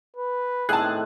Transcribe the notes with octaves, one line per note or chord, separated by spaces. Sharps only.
B4
A2 D#3 C4 G#4 A5 F#6